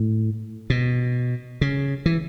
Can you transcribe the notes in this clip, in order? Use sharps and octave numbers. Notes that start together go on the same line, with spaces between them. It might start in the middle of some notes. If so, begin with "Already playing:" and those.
Already playing: A2
B2
C#3
E3